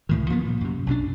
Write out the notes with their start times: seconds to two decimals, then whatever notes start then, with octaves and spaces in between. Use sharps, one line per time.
0.09 C#2 A2 D#3
0.30 F3 A#3 B3
0.45 A#2
0.61 F#2 C3
0.87 B1 F#2 C3 D4